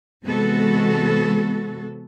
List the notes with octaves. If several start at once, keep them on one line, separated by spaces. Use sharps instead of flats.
C3 E3 G#3 B3 F#4 A4